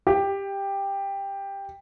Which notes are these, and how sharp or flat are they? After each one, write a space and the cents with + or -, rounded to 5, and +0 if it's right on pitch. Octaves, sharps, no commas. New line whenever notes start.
G4 +10